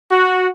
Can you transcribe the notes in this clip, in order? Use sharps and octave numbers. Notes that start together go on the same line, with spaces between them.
F#4